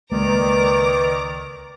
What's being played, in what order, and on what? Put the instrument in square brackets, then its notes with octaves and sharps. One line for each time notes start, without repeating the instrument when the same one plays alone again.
[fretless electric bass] C#2 G#3 A#3 [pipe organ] D#3 D5 [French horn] B4 [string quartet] A#5 D6